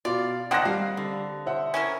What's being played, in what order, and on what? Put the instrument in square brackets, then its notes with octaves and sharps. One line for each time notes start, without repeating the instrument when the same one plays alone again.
[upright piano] B2 F5 [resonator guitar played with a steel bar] F4 [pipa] D5
[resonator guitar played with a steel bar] D#3 F#5 [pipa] A#3 C4 D4 [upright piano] D#6 F#6 A#6
[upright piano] G3 [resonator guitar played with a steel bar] F5
[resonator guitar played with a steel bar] D3
[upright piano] C5 E5 F#5
[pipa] C#4 E4 A#4